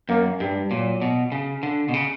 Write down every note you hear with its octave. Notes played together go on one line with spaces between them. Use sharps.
F#2 A#3
G2 G3
A#2 F#3
B2
C#3
D3
B2
C#3